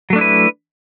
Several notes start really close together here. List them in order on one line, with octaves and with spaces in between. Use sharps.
F#3 A3 D4 E4 B4